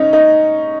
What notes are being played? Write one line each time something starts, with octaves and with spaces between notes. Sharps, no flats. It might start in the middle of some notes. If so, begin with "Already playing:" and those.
Already playing: C#4 D#4
D#4